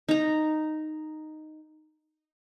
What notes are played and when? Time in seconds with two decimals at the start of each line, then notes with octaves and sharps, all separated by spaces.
0.09 D#4 A#5